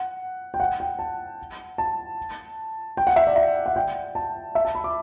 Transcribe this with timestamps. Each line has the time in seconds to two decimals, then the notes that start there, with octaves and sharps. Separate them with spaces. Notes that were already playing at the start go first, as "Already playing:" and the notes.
Already playing: F#5
0.54 G5
0.60 F#5
0.80 G5
0.99 A5
1.78 A5
2.97 G5
3.07 F#5
3.16 E5
3.27 D5
3.36 E5
3.66 F#5
3.76 G5
4.15 A5
4.55 E5
4.65 A5
4.75 B5
4.84 D6